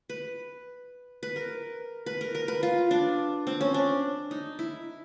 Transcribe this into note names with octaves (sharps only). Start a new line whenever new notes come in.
B4
B4
A#4
B4
A#4
A#4
B4
F4
D4
C4
C#4
D4
D#4
E4